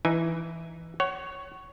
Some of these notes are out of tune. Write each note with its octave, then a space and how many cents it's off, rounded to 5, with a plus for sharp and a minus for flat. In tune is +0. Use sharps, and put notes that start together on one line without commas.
E3 +0 D#4 +0 G#5 +0
C#5 +0 F#5 +30